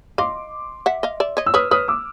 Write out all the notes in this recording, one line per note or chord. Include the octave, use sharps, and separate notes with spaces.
D#5 F5 C6 D6
E5 F#5
D#5 F5
D5 E5
C#5 D#5
E6
B4 C#5 D#6 F6
B4 C#5 D#6 F6
D6 E6